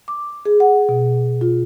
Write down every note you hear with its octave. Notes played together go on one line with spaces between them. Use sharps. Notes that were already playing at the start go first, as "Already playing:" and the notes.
D6
G#4
F#5
B2
F4